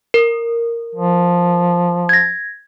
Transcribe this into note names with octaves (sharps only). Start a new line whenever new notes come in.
A#4
F3
G#6 A#6